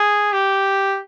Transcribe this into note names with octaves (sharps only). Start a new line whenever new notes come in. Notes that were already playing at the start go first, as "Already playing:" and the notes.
Already playing: G#4
G4